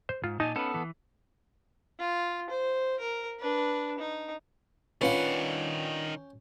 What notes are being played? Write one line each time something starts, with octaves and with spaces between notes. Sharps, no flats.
C5
G#2 F4
A#2 D#4 G#5 A5
B3 C#4 A4 B4
E3
F4
C5
A#4
D4 B4
D#4
D#3 C#4 D4 F4 B4 F#5 G5